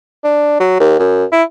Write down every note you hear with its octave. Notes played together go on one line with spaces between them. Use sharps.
D4
F#3
D#2
F#2
E4